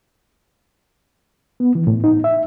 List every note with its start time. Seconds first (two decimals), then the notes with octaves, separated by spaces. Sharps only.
1.60 B3
1.75 E3
1.87 A2
2.04 D#4
2.24 E5